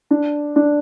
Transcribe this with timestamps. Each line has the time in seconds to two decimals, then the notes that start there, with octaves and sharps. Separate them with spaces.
0.11 D4
0.56 D4